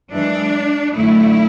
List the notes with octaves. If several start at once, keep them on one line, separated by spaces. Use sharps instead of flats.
F#2 E3 G#3 D4
F#2 D3 A3 E4